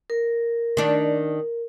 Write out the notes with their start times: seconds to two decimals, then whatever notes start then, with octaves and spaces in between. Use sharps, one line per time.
0.10 A#4
0.77 D#3 D4